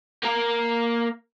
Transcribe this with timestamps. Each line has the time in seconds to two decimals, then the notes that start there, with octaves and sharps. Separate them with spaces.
0.23 A#3 A#4